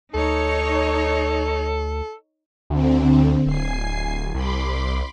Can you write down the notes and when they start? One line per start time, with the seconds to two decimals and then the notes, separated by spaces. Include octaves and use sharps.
0.14 D2 D#4 A4 C#5
2.70 D2 D3 C4
3.46 D1 G#5 C7
4.34 C2 B5 C6 D6